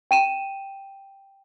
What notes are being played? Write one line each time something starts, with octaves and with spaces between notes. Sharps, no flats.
G5 D#7 E7